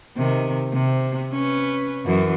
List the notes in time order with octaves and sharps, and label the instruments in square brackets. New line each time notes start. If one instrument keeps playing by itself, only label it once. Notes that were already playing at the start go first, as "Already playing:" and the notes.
[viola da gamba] C3 D#3
C3
C#4 B4
F#2 E3